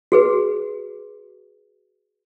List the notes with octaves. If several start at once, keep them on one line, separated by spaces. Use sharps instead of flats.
F#4 G#4 B4